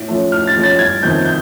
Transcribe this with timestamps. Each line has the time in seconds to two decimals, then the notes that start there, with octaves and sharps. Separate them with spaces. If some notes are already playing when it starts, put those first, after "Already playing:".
Already playing: A2
0.08 F3 A3 C#4
0.32 A2 F6
0.47 A6
0.55 F3 A3 C#4
0.64 A6
0.79 G1 G#6
1.02 F2 C3 D#3 G6
1.25 G6